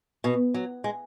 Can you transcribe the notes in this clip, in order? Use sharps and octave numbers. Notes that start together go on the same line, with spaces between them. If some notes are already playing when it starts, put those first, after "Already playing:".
B2
F#3
G#3